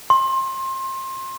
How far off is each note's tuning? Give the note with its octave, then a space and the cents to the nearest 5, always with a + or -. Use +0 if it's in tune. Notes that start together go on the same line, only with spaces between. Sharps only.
C6 +25